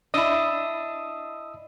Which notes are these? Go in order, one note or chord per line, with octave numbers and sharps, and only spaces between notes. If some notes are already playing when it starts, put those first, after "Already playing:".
D4 E4 D#5 D#6 E6